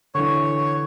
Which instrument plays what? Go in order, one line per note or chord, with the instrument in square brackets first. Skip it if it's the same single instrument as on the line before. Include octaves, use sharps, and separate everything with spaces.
[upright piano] D3 E3 [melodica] C#5 C#6